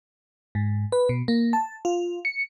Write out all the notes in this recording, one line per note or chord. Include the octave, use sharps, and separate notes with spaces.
G#2
B4
B2
A#3
A5
F4
C#7